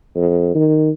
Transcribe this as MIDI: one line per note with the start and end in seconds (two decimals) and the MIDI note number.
0.15 0.54 41
0.55 0.89 51